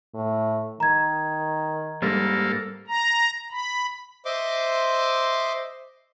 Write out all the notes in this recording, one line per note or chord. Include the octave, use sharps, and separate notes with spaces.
A2
D#3 A#5 G#6
G#2 G3 A#3 A4
A#5
B5
C5 D#5 E5 C6 D6